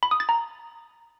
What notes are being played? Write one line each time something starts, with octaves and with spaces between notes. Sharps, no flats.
B5
D#6
A6
A#5